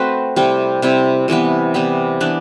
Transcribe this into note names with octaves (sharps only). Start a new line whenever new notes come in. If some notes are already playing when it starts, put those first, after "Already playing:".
Already playing: A3 C4 F#4 B4
C3 G3 C4 E4
C3 G3 C4 E4
C3 E3 G3 B3
C3 E3 G3 B3
E3 B3 D4